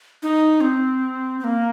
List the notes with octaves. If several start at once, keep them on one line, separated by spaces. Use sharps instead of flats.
D#4
C4
C4
A#3